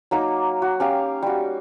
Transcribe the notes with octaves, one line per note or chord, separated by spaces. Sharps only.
F#3 A#3 D#4 D6
F#4
C#4 G4 F5
G3 F#4